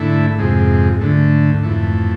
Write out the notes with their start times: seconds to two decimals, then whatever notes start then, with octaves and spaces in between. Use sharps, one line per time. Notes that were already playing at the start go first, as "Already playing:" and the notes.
Already playing: G#2 D3 A3 E4
0.38 F2 C3 G#3
1.01 D2 D3 A3
1.63 F2 E3 A3